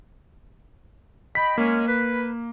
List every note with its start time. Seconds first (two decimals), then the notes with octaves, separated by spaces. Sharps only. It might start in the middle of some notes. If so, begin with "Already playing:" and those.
1.35 D#5 G5 B5 B6
1.58 G#3 A#3 C#4
1.87 B4